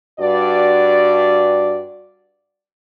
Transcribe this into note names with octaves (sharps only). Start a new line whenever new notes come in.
G2 F#4 D5